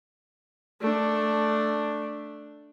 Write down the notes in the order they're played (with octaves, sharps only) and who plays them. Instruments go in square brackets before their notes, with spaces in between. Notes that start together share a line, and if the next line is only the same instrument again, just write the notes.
[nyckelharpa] A3 D4